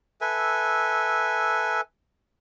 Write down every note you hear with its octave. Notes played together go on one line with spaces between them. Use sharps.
A4 B4 E5 G#5